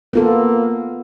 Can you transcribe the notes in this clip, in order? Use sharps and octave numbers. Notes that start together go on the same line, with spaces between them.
A#3 B3 F4 A4